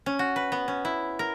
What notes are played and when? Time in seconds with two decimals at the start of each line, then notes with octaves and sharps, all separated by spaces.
0.06 C#4
0.19 F#4
0.36 B4
0.52 B3
0.68 C#4
0.85 E4
1.19 A#4